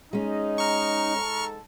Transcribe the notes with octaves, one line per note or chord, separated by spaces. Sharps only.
G#3 C#4 D#4
A#5 C#6 F6
G#2 A4